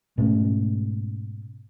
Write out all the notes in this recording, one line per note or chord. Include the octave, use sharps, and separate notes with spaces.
G#2 B2 A3 C#4